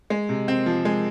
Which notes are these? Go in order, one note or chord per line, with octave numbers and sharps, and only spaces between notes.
G#3
C3
C4
F3
G#3